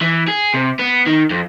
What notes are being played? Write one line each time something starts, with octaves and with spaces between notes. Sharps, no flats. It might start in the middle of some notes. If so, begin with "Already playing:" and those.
E3
G#4
C3
B3
D#3
F2